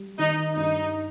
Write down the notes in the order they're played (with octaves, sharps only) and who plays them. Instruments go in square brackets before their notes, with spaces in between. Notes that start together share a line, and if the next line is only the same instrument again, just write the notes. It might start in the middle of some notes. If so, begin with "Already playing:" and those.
Already playing: [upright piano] G3
[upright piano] D#3 [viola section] D#4
[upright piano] G2 [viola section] D#4